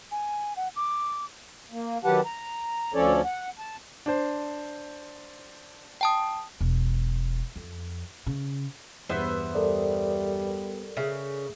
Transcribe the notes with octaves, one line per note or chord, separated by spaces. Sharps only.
G#5
F#5
D6
A#3
D#3 F#3 G4 B4 F#5 A5
A#5
D2 F3 C#4 A4 C#5 D5
F#5
A5
D4 C5
G5 A5 D#6
E1
F2
C#3
E2 G2 B3 C5 E5
G3 A4 A#4 D5
C#3 G#4 E5